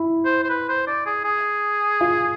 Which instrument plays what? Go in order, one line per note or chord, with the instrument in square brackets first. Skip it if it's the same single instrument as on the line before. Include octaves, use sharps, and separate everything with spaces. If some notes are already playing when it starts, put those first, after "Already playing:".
Already playing: [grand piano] E4
[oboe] C5
C5
B4
C5
D5
G#4
G#4
[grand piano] F4